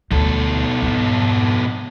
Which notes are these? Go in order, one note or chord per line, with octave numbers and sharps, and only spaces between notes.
D2 B2 A4
F2 G#2